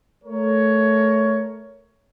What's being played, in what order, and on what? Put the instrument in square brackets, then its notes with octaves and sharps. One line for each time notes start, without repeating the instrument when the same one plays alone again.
[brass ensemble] A3 A#4 C#5